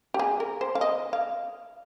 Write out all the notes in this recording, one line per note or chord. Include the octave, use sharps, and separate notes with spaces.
G4
G#4
A#4
C5
F5
D#5
F5